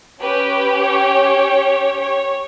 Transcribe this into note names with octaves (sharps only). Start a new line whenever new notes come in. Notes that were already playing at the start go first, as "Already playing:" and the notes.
C#4 G4 B4
C#5
C#5